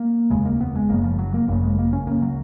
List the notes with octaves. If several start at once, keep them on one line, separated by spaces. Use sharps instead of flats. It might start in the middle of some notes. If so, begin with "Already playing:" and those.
Already playing: A#3
F1 D#2 C#3 G#3
A#3
B3
G#3
F#1 F#2 C#3 A#3
F3
F#3
A#3
G#1 F#2 C#3 A#3
G#3
A#3
C#4
C#2 C#3 A#3
F#3